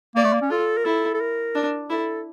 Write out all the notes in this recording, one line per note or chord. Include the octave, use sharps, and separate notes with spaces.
A#3 D5
A3
A#3
C#4
F4 A4
A#4
E4 A4
A4
A#4
D4
E4 A4